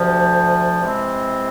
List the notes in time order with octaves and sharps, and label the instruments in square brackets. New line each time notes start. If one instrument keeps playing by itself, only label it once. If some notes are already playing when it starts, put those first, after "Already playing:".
Already playing: [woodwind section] D2 C3 F3
C3 E3 G#3 C4